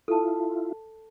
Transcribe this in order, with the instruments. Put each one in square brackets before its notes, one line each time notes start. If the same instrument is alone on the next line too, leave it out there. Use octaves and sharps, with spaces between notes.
[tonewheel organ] E4 F4 [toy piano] A4 A5